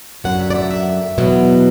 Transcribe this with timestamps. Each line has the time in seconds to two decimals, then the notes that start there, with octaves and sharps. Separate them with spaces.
0.24 F#2 D3 F#3 F#5
0.40 E5
0.50 D5
0.55 E5
0.71 E5
1.18 E2 B2 F#3